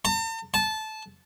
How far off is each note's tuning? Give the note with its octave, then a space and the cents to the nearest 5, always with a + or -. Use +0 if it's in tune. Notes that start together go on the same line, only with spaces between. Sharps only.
A5 +45
A5 -15